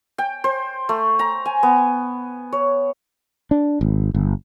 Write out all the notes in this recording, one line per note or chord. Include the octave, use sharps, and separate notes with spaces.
G5
C5
A3
A#5
G#5
B3
C#5
D4
G#1
G1